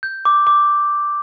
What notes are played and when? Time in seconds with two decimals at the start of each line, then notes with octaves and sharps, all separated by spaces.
0.03 G6
0.25 D6
0.47 D6